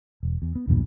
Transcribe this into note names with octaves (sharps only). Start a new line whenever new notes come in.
E1
E2
B3
B1 E2 G2 A#2